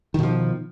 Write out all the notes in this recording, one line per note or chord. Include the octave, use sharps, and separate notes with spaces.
B2 D#3 F3